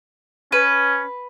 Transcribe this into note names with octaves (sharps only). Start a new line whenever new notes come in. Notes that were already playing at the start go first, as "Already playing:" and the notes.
C#4 B4